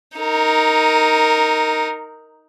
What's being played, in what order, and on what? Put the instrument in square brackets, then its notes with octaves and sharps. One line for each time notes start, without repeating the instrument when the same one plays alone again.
[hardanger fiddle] D#4 A#4